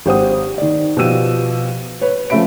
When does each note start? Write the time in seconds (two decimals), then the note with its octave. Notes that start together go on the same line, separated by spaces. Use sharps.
0.06 G#1 G4 C5 F#5 D#6
0.58 D#3 D5
0.97 B2 F3 G4 E6 D#7
2.01 B4 C#5
2.30 F3 A3 C#4 E5 B5 D7